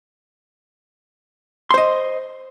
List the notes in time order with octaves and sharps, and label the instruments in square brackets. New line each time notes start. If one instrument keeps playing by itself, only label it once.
[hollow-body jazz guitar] C6
C5
D#5